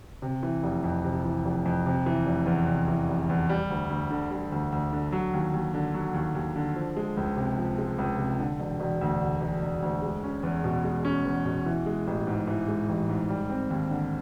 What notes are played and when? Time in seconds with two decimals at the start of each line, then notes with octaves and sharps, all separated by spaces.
0.22 C3
0.43 E3
0.63 F1
0.84 F2
1.04 C3
1.25 E3
1.45 F1
1.65 F2
1.86 C3
2.06 E3
2.26 F1
2.46 E2
2.67 C3
2.88 E3
3.09 F1
3.29 E2
3.49 G3
3.70 D2
3.90 D2
4.10 D3
4.31 G3
4.52 D2
4.72 D2
4.93 D3
5.12 F#3
5.33 D#2
5.54 D#2
5.74 D3
5.94 F#3
6.14 D#2
6.35 D#2
6.56 D3
6.76 F3
6.97 G#3
7.17 C#2
7.37 C3
7.58 F3
7.78 G#3
7.99 C#2
8.18 C3
8.40 D3
8.60 E1
8.80 E1
9.01 D2
9.21 D3
9.41 E1
9.62 E1
9.82 D2
10.02 G#3
10.24 C#4
10.43 E2
10.64 B2
10.84 G#3
11.05 C#4
11.25 E2
11.45 B2
11.66 E3
11.86 G#3
12.07 A1
12.27 G#2
12.47 E3
12.68 G#3
12.89 A1
13.09 G#2
13.29 G3
13.49 C4
13.70 D#2
13.91 D3